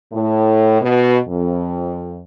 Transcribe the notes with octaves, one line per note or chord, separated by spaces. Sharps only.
A2
B2
F2